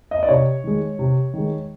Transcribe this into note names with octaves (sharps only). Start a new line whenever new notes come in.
D#5
D5
C3 C#5
D#3 G#3
C3
D#3 G#3